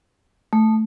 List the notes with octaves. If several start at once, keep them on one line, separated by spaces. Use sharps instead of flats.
A3